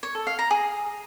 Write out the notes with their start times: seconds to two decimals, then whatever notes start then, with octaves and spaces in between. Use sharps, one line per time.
0.03 C#5
0.15 A4
0.27 F5
0.39 A#5
0.51 G#4